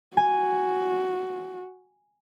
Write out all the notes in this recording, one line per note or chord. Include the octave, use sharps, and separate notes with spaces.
F#4 G#5